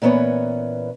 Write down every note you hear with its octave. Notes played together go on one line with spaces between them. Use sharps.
A#2 E3 B3 C#4 C#5